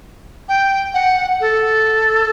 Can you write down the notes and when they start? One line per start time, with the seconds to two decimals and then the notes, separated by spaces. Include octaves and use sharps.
0.49 G5
0.94 F#5
1.40 A4